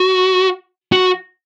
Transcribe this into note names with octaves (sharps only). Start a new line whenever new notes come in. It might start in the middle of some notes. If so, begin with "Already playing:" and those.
Already playing: F#4
F#4